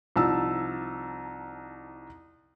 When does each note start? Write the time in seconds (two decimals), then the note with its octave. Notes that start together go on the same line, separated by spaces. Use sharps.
0.16 C2 F3 D#4 A5 E6